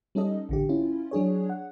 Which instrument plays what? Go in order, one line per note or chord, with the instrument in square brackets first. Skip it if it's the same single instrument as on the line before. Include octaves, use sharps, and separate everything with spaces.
[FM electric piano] G3 C#4 D#4 A4 D#5
A1 D3 G4
C#4 E4 F4
F#3 D4 G#4 C#5
F#5